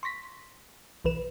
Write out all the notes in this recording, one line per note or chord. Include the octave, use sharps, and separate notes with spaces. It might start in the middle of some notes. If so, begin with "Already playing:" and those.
C6 C#6 A#6 B6
B1 E3 B4 E7